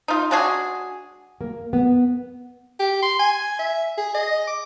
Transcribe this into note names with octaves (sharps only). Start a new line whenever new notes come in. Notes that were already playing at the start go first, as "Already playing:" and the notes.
D#4 F4
G#3 D4 F#4 G#4
A#3
B3
G4
C6
G#5
E5
G#4
D#5
D6